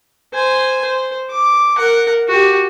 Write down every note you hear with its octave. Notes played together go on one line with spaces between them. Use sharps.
C5 G#5
C5
D6
A#4 F#5
F#4 G4